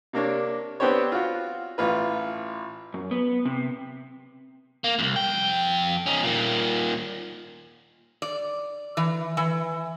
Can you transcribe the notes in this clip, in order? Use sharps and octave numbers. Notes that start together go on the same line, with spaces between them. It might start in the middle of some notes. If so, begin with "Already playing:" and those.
C3 A#3 D4 C#5
B3 C4 D4 G4 C5 C#5
F4 F#4
A1 F4 B4
F#2
B3
C3
A#3
C2 F2
F2 G5
C#4 D#4
A#2 D#3
D5
E3
E3